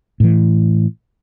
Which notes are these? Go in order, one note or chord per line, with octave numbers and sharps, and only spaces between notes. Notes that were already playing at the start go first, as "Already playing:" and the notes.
A2 E3